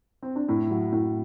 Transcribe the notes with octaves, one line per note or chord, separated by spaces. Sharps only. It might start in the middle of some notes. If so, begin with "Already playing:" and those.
C4
D4
A2 E4
F#3
A2